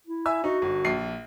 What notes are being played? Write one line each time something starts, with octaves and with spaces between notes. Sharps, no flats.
E4
E5 G#5 E6
D#4 F#4
G1
A#1 C7